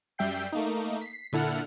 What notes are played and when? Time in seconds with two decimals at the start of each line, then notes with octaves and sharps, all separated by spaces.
0.18 F#2 G3 E5 G5 G6 C7
0.52 A3 A#3 D#4
1.02 B6 C7
1.32 A#2 D3 E4 A4 F#5 F6